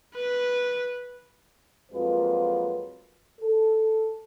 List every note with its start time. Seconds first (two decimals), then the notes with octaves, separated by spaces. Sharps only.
0.15 B4
1.92 F2 F#3 G#3 A#3 F4 B4
3.41 A4